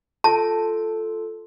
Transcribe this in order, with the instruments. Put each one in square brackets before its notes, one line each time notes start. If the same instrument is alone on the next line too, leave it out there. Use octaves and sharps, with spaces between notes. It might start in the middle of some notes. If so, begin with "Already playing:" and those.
[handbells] F4 A4 [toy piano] A5